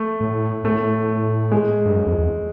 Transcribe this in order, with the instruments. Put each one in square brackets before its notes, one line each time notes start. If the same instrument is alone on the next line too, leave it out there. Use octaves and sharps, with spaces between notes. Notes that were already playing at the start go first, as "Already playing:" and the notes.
Already playing: [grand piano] A3
[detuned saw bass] A2
[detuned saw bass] A2 [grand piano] A3
[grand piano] G#3
[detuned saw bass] G2
F#2
F2
E2